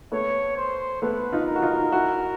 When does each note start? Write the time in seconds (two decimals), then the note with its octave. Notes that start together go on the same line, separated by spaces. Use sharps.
0.12 A3 B3 C#5
0.56 C5
1.02 A3 B3 B4
1.32 D#4 F4
1.48 A#4
1.56 F#4
1.62 D#4 F4
1.92 E4 F#4